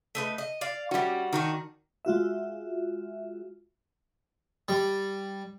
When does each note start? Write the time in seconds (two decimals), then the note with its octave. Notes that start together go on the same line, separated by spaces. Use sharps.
0.15 A3 D#4 B4
0.38 D#5
0.61 D5 F5
0.91 G3 C#4 F#4 G4
1.33 D#3 D4 D#4 F#4
2.05 G#3 F4 F#4 E5
4.68 G3